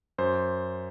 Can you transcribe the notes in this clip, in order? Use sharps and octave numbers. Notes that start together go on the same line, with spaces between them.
F#2 C5